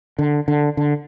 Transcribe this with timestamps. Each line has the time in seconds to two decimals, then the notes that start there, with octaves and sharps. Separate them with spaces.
0.19 D3
0.48 D3
0.77 D3